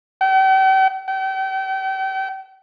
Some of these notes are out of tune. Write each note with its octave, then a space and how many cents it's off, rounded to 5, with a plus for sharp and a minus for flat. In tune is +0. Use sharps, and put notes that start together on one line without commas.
G5 -40
G5 -35